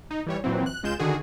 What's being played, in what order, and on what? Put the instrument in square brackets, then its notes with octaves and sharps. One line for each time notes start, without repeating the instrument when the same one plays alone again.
[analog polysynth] D#4
E3 G3 C#5
A#2 E3 F#3 C4
F#6
C#2 G#3 F4 G6 E7
D3 D#3 F#4 G#4